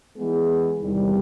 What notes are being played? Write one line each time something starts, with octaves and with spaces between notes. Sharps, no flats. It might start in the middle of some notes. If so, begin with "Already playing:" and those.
E3 G#3 B3 E4 G#4
E2 C3 D#3 G3